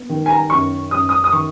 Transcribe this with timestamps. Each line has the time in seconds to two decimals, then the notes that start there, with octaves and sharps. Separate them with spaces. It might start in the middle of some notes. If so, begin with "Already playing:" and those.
Already playing: B3
0.09 D#3
0.26 G#5
0.30 A#5
0.50 F#2 C#6
0.91 F#2 D#6
1.09 D#6
1.24 D#6
1.32 D#3 C#6